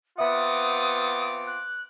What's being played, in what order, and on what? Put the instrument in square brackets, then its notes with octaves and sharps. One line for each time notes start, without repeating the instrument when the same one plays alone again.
[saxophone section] B3 F#5 [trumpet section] C4 F4 D6 [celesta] E5 [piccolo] D#6
[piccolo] F#6